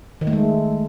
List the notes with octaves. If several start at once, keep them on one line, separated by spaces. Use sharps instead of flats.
D#3
A3
G#3